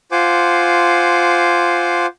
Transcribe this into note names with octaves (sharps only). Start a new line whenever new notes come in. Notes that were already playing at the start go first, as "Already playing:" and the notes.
F4 C5 F#5 G#5 D6